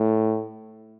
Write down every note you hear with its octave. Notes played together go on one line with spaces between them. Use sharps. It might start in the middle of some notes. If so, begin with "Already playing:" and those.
Already playing: A2